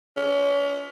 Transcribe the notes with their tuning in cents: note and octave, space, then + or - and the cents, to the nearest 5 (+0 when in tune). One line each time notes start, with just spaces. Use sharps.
C#4 +35